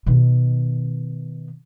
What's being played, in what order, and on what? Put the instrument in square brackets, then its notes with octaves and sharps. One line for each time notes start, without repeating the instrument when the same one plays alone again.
[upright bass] B2 D#3